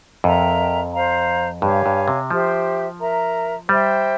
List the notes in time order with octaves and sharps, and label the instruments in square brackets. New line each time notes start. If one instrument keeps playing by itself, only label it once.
[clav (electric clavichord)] F2 [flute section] A#4 E5 G5 A#5
[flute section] C5 F5 A#5
[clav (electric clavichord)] G2 [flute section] G4 C#5 F5 G#5
[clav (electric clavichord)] G2
C3
[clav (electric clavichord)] F3 [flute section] G4 C5 E5 G5
[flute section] A#4 E5 A#5
[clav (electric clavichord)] G3 [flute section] C5 E5 G5